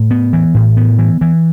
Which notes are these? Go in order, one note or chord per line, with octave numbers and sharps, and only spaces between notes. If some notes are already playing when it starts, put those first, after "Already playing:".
Already playing: A2
B3
E3
A2
B3
E3
E3